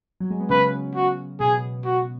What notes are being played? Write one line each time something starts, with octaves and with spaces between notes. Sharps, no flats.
F#3
G#3
B3
C#3 C#4 B4
F#4
B2 B3 G#4
F#4